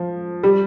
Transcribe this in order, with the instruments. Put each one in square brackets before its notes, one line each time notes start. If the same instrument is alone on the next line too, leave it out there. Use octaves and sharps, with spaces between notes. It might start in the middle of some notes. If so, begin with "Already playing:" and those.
Already playing: [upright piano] F3
G3